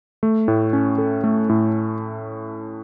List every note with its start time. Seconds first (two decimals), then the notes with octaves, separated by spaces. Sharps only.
0.23 A3
0.48 A2
0.73 C#4
0.98 A4
1.24 A3
1.49 A2